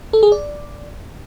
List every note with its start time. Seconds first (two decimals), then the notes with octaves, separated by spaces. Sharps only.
0.13 A4
0.23 G#4
0.32 D5